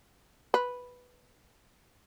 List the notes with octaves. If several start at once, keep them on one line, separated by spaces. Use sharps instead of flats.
B4